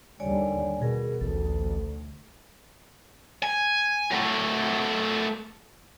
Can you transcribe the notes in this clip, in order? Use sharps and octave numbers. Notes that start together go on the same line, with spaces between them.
D#2 D3 G3 C#5 D5 G#5
B2 G#4 A#4
A1 D2 A4
G#5
F#3 A3